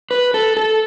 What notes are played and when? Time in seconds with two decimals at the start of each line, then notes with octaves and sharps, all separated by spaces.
0.11 B4
0.34 A4
0.57 A4